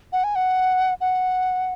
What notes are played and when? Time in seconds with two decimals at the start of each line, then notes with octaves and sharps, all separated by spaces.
0.12 F#5
0.24 G#5
0.35 F#5
1.01 F#5